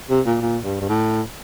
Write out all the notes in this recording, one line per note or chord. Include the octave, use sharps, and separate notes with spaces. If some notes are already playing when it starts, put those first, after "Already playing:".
C3
A#2
A#2
G2
G2
A2